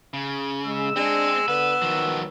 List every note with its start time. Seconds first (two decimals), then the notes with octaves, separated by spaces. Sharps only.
0.14 C#3
0.66 G#3 E6
0.96 G#3 C4 D4
1.48 D3 B3 B4
1.82 D#3 F3 F#3